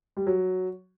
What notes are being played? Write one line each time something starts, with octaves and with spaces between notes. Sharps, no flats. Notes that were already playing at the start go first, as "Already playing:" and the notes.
G3
F#3